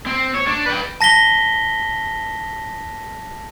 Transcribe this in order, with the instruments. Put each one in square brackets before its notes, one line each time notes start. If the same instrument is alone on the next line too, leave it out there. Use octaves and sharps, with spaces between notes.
[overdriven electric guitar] C4
C#5
D4
B4 G5
[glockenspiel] A5 A#6 B6 G7